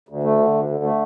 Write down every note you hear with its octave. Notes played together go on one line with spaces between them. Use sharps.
D2
A3
D3
D2
D3
A3